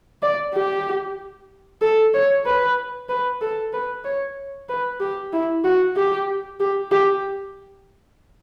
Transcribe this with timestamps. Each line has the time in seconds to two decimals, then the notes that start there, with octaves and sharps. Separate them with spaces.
0.23 D5
0.54 G4
1.82 A4
2.14 C#5
2.46 B4
3.09 B4
3.41 A4
3.73 B4
4.04 C#5
4.69 B4
5.00 G4
5.33 E4
5.64 F#4
5.96 G4
6.60 G4
6.91 G4